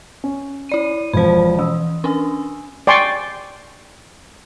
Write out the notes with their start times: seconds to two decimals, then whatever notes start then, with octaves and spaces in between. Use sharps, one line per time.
0.24 C#4
0.69 E4 D5 D#7
1.13 E1 F3 C5 B5
1.59 E3 D#6 E6
2.04 C#4 D4 G#5
2.87 D5 G5 G#5 C6 C#6